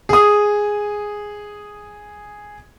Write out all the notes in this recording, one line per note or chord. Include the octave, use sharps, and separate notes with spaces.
G#4 D#6